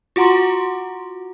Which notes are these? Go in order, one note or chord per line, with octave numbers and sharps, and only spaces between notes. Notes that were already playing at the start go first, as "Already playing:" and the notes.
F4 F#4 F#5 A#5 C6